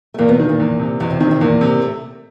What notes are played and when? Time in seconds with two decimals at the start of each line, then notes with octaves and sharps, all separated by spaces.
0.14 A3
0.18 E2 A#2 A#3
0.28 B2 B3
0.39 D#3
0.49 A#2 A#3
0.60 E2
0.80 C3
1.00 E2 B2 B3
1.10 C3 C4
1.20 C3 D#3 C4
1.31 C3 C4
1.41 E2 A#2 A#3
1.61 C3
1.81 A2 A3